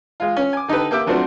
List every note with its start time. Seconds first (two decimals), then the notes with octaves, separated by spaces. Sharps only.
0.20 G#3 F4
0.36 C#4
0.53 G#5 D6
0.68 D3 D#4 G4 A4 B4
0.91 A#3 G4 E5 G5 D6
1.07 F3 F#3 A3 C4 D4 C5